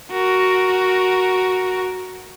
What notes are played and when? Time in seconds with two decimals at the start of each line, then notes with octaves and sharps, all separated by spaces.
0.12 F#4 A#4